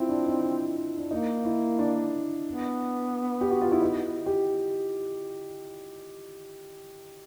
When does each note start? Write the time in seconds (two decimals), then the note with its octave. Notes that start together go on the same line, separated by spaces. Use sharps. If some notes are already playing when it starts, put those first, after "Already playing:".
Already playing: C4 E4 F4
0.09 D4
0.27 D#4
0.97 D4
1.11 A#3 D#4
1.45 E4
1.79 D4
2.46 B3
3.41 G4
3.51 F#4
3.61 F4
3.72 E4
3.81 D#4
4.26 G4